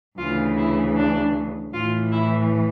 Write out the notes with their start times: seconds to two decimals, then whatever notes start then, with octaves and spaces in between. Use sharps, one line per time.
0.18 D2 C#3 E3 F4
0.56 E4
0.96 D4
1.73 A2 E3 F4
2.11 E4